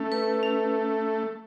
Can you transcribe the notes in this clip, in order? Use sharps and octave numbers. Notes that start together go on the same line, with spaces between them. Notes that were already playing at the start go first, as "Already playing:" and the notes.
Already playing: A3 C#4
B4
C#4